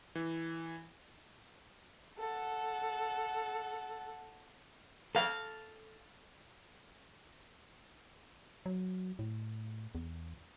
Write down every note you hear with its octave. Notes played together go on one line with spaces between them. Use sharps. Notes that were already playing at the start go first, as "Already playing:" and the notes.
E3
A4 F#5
A4 F5
F#3
A2
E2